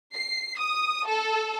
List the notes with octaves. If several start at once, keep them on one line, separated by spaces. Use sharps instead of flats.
C7
D#6
A4